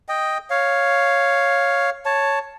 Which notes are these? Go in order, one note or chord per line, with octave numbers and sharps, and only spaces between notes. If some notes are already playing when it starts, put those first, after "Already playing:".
D#5 G5
C#5 F5
C#5 A5